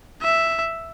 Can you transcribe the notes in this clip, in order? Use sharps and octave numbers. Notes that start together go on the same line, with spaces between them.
E5